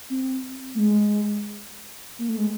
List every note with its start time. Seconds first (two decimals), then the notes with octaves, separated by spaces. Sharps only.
0.10 C4
0.75 A3
0.79 G#3
2.19 A#3
2.29 A3
2.38 G#3